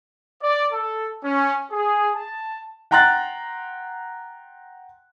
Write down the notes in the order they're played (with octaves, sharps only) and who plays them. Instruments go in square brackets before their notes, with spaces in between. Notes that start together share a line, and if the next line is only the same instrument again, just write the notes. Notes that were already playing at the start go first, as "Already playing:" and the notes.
[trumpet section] D5
A4
C#4
G#4
A5
[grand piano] F#5 G5 A#5 C6 F#6 A6